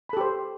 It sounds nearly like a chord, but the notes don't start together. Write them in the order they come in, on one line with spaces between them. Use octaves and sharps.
B5 A4 G4 C5